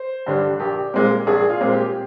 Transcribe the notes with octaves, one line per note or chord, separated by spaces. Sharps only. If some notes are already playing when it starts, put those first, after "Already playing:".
Already playing: C5
G2 D3 G3 D4
A#1 G4
A#2 G#3 C4
A#1 G#4
F4
A#2 G#3 C4
G4